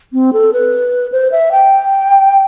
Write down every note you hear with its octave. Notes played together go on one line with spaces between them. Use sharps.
C4
A4
B4
C5
E5
G5